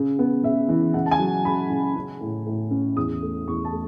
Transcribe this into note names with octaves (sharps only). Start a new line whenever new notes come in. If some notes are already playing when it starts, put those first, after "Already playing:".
Already playing: C#3
B3
C#3 E5
E3
C#3 F#5
A5
G#5
F#3
C#3 B5
C#3
C#4
A2
A2
C#4
E2 D#6
A3
E2 C#6
A5
A3